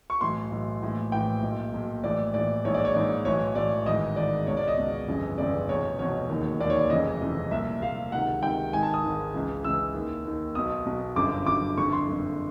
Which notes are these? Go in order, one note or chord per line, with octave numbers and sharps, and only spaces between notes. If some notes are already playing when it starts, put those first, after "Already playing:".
C#6
B1 A2 E3 C6
B1 A2 E3
A#1 A2 E3
A#1 A2 E3 G5
B1 A#2
B1 A#2
A#1 A2 E3 D5
A#1 A2 E3 D5
A#1 G#2 E3 C#5
D5
C#5
A#1 G#2 E3 D5
B1 A2 E3 C#5
B1 A2 E3 D5
G#1 G#2 E3 D#5
G#1 G#2 E3 D5
C#2 B2 C#5
D5
D#5
C#2 B2
G1 F2 C#3 E3
G1 F2 C#3 E3 D5
F1 E2 B2 C#5
F1 E2 B2 C#5
E1 D#2 D#3
E1 D#2 D#3 D5
C#5
D5
F1 F2 C#3 E3 D#5
F1 F2 C#3 E3
C2 A#2 E5
C2 A#2 F5
C#2 C3 D#3 F#5
C#2 C3 D#3 G5
G#1 G#2 D#3 G#5
A5
D#6
G#1 G#2 D#3
C#2 C#3 E3
C#2 C#3 E3 E6
D#2 D#3
D#2 D#3
B1 B2 D#6
B1 B2
G1 F#2 D3 D6
G1 F#2 D3 D6
F#1 F2 D3 C#6
C6
F#1 F2 D3